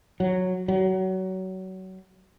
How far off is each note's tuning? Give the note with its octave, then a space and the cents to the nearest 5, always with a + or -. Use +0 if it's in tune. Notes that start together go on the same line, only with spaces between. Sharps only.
F#3 -5
F#3 +25